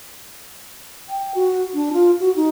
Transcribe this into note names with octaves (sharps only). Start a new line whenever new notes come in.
G5
F#4
D4
F4
F#4
D#4